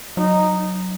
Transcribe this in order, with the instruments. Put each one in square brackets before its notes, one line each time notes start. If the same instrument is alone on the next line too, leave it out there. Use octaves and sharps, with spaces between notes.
[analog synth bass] F#3 [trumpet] D#4